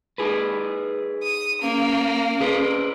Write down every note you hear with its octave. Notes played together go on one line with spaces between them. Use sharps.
D#4 G#4 B4
D#6
A#3 C#4
G#4 B4 C5